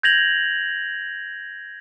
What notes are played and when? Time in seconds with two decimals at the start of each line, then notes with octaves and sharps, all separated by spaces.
0.03 G6 G#6 A#6 F7 F#7